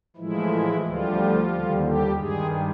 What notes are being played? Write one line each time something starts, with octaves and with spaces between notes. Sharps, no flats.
A2 E3 F3 G#3 E4
D2 D3 F3 G3 F4
D#2 D3 G3
G3 G4
G2 D#3 G3 G#3 G#4